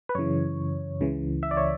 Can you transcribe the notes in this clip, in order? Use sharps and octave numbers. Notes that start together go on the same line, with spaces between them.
B4
F#2 C#3 E3 C#5
C#2 C#3 E3
E5
D5
C#5